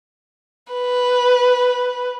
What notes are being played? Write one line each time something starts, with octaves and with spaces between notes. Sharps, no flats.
B4